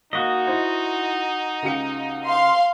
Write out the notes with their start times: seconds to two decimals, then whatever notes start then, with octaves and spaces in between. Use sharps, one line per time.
0.13 A#3 D#4 F#4 D#5
0.47 E4 C5
1.63 C#2 G4 C#7
2.28 F5 C6